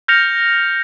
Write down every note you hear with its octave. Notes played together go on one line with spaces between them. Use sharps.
F6 G6 A#6 C#7 F7